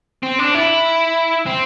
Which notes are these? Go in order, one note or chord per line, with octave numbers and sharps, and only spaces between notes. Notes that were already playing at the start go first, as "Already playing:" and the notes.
C4
D4
E4
C4